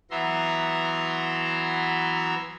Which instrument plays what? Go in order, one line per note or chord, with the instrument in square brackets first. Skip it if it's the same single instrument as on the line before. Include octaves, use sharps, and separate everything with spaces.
[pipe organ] E3 F#3 B3 E5 A#5 C6